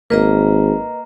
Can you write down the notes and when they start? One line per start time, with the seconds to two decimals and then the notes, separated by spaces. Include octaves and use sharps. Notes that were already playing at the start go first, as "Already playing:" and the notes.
0.10 G#1 A#3 B4 D#5 A#5